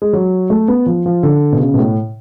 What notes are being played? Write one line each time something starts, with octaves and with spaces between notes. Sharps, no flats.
G#3
F#3
A3
B3
F3
F3
D3
B2
C#3
B2
A2